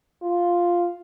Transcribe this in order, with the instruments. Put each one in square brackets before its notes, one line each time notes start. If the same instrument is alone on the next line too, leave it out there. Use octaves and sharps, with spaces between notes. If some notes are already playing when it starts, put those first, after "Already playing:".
[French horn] F4